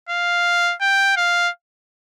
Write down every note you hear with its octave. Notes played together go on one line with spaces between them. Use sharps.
F5
G5
F5